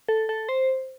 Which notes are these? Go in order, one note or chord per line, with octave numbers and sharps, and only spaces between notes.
A4
A4
C5